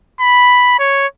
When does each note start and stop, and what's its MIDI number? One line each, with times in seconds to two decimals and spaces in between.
0.21 0.75 83
0.79 1.07 73